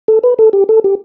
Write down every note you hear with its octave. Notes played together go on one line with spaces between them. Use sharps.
A4
B4
A4
G4
A4
G4